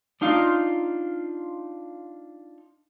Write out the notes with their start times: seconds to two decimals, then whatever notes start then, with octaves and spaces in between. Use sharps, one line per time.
0.21 D4 D#4 F4 F5